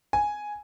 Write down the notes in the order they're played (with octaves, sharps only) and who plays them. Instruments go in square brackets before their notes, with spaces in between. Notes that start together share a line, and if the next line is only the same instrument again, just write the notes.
[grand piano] G#5